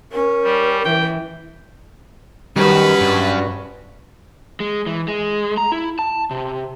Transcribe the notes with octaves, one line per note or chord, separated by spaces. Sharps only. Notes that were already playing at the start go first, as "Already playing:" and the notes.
C#4 A#4
G3
E3 G5
D#3 G3 C#4 F#4 B4
G2
G#3
E3
G#3
A#5
E4
A5
C3